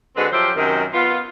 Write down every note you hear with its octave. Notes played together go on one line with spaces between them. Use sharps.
D3 G#3 C4 F#4 B4
F3 F#3 G4 C5 E5
F#2 C3 D#3
B3 F4